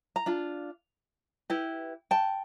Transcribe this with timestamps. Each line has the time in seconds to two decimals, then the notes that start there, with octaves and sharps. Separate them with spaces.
0.16 A#5
0.26 D4 F4
1.50 E4 G4 B4
2.11 G5 A5